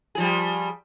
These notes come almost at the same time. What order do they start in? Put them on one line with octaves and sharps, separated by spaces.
G#4 F3 G3